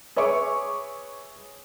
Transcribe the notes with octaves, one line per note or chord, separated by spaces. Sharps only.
G#4 B4 C#5 E5 C#6 D6